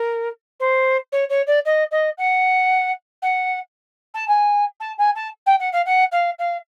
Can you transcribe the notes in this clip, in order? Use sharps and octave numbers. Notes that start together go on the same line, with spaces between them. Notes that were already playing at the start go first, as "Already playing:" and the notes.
Already playing: A#4
C5
C#5
C#5
D5
D#5
D#5
F#5
F#5
A5
G#5
A5
G#5
A5
G5
F#5
F5
F#5
F5
F5